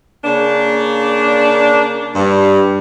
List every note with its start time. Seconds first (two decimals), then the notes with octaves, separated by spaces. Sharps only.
0.25 C#3 A#3 D4
2.16 G2